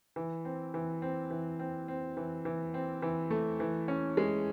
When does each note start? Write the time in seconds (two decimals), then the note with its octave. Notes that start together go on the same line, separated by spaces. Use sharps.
0.16 E3
0.45 C4
0.74 E3
1.02 C4
1.31 E3
1.59 C4
1.88 C4
2.17 E3
2.45 E3
2.74 C4
3.02 E3
3.31 A3
3.60 E3
3.88 C#4
4.17 G#3